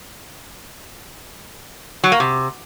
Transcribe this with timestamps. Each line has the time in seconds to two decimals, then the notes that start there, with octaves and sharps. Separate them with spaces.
2.04 F#3
2.12 A#3
2.20 C3